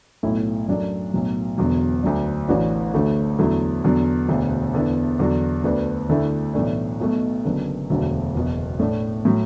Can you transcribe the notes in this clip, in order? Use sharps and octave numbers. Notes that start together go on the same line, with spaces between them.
B1 A2 A3 E4
F#2 F#3 A3 D4
B1 A2 F#3
E1 E2 D3 F#3
D2 D3 F#3 D4
A1 A2 E3 D4 F#4
D2 D3 A3 F#4
E2 D3 F#3 A3 E4
E2 D3 F#3
E1 D2 D3
E2 D3 B3 E4
E2 D3 F#3 D4 F#4
D2 D3 B3 D4 F#4
D2 D3 A3 E4
B1 A2 E3 A3 D4
B1 B2 F#3 A3
F#1 F#2 D3 B3
E1 D2 D3 F#3
F#1 E2 B2
A2 A3 D4
A2 F#3